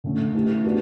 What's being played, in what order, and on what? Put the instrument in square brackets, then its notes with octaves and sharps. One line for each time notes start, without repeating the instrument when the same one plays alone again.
[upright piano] D3 A3 C#4
E3 A3 E4 G4
B3 D4 F#4